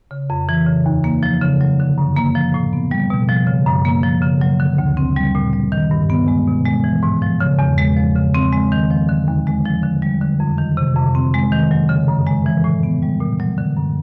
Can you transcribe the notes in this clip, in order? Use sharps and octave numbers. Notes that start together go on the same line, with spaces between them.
C#3
F2
E3
C#3
D#2
A#3
F3
C#3
F#3
D3
F#2
A#3
F3
A2
B3
G3
B2
F3
C#3
F#2
A#3
F3
C#3
F#3
D3
D2
C4
G3
A#2
G3
D#3
G2
B3
G#3
B2
G#3
E3
G#2
F3
C#3
E2
G#3
F3
C#3
C4
G#3
D#3
F3
D3
D#2
G#3
F3
D3
G3
D3
F2
D#3
C3
F2
C4
G#3
D#3
F#3
C#3
F#2
G#3
E3
A2
B3
G3
A#2
F#3
D3
F#2